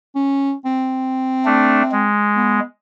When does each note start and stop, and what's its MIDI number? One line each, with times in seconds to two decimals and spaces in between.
0.15 0.54 61
0.65 2.08 60
1.45 1.82 57
1.45 1.82 62
1.92 2.60 56
2.36 2.64 59